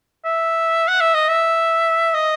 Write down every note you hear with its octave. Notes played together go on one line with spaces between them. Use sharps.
E5
F#5
E5
D#5
E5
D#5